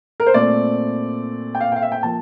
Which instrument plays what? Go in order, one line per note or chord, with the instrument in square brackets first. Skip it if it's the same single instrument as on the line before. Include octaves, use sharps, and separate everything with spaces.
[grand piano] A#4
C5
A#2 A3 C4 D5
G5
F5
F5 G5
E5
G5
F3 A#3 A5